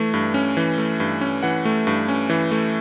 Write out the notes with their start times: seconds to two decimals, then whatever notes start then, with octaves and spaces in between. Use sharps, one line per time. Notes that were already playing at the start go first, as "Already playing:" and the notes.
Already playing: E3 A3
0.14 G2
0.34 C#4
0.57 E3
0.78 A3
1.00 G2
1.21 C#4
1.43 E3 F#5
1.65 A3
1.87 G2
2.08 C#4
2.30 E3
2.51 A3